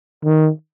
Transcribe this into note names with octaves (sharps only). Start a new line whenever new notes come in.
D#3